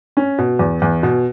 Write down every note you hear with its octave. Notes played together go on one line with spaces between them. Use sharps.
C#4
B2
E2
E2
B2